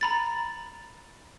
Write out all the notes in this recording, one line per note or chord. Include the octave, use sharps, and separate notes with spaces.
A#5 B5 A6